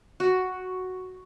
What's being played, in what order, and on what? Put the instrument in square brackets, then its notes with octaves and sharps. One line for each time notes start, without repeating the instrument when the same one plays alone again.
[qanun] F#4